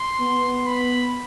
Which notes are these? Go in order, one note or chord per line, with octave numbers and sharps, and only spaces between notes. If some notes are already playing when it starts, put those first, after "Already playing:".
Already playing: C6
B3
B5